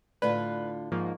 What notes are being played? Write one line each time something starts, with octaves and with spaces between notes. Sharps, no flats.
A2 D3 D#4 F4 B4 D5
G#2 F3 A#3 C#6